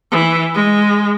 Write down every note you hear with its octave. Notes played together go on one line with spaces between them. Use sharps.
E3
G#3